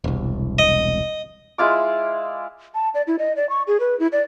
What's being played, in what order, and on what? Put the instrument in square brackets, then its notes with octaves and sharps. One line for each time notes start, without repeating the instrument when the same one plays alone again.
[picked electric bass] E1 C2
[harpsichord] D#5
[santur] G#3 E4 F4 D6
[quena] A5
D5
E4
D#5
D5
C#6
G#4
B4
E4
D5